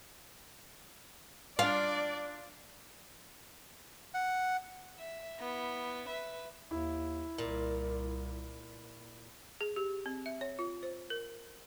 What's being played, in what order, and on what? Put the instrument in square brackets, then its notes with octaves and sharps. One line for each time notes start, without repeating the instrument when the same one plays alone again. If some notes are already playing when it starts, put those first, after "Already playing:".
[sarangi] D4 [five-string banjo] F4 [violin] D5 [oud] F5
[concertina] F#5
[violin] E5
B3 E4
B4 E5
[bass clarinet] D#2 [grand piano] E4
[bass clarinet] C2 [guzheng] A#2
[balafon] G#4
G4
C4
E5
C#5
F4
C5
A#4